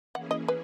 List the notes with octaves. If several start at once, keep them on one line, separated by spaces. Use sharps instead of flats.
E3 A#3 C#4 E4 G#4 F#5
D#5
B4